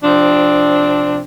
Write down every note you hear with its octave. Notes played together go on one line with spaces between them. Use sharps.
C3 F3 C4 D4